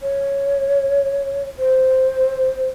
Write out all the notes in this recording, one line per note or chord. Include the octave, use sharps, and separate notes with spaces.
C#5
C5